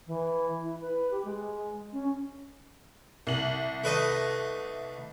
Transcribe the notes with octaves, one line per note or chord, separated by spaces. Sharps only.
E3
E4
B4
G4
G#3
C#4
C2 F#7
A3 B4 D#5